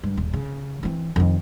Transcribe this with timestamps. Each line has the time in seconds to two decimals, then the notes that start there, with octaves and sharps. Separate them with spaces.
0.03 G2
0.17 D#1
0.33 C#3
0.83 E3 C4
1.16 F2 D#3